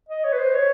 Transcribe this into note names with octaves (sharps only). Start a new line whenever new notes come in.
D#5
C#5
B4
C5
C#5